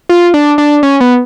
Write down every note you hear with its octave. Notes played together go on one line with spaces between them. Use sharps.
F4
D4
D4
C#4
B3